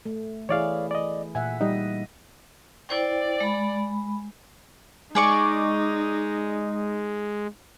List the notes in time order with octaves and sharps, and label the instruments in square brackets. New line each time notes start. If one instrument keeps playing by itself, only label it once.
[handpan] A3
[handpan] E3 E4 G#4 [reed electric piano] C#5 D5 F5
[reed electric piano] D5 D#5
[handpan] A#2 E5 F#5 [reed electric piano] G#5
[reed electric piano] G3 D#4 [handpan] D#5
[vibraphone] E4 C5 G5 [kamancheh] D5
[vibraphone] G#3 B5
[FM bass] G#3 [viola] D#4 [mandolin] G#4 D5 C#6